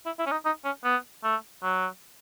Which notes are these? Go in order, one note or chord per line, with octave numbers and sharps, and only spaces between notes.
E4
E4
C#4
D#4
D#4
C#4
B3
A3
F#3